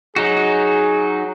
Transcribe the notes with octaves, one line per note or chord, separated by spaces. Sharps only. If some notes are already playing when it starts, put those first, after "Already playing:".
F#3 D#4 F#4 G#4